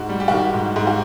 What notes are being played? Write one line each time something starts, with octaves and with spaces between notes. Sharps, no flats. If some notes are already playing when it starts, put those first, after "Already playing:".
Already playing: G#2 F#4
G3
G4
D#3 F#4
G4
G#2
G#2
F#4